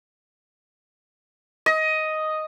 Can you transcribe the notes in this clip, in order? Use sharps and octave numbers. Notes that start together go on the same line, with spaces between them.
D#5